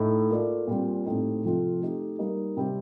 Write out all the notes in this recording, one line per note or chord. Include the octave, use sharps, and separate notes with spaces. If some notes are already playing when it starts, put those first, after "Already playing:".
Already playing: A2 A3 D#4
A#3 F4 A4 D5
A#2 G3 C4
A2 A3 C4 D#4 G4
C3 F3 C4 F4 A4
A3 D#4 G4
G3 A#3 D#4
C3 G3 C4